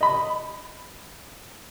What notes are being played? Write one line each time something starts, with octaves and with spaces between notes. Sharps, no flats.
D#5 B5